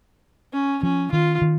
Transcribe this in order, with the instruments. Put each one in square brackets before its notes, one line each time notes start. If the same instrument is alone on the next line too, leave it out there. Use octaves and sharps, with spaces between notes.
[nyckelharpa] C#4
[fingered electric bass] F3 [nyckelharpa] C#4
[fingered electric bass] D#3 [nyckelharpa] F4
[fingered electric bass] D#3